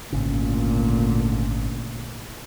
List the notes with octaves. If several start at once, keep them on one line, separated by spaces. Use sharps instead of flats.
G#1 D2 A#2 C#3